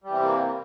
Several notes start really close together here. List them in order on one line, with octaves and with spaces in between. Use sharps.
G3 E3 C4 C3 A#3